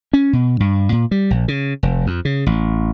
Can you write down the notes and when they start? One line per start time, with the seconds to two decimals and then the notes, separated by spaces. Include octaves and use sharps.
0.13 C#4
0.33 B2
0.60 G2
0.92 A#2
1.11 G3
1.31 A#1
1.48 C#3
1.83 F1
2.07 F2
2.25 C#3
2.46 A1